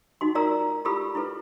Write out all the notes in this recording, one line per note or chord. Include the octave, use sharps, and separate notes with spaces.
D#4 F#4 C6
F4 A#4 D5 A#5 E6
E4 F4 G4 A4 B5 E6
E4 F4 A4 B4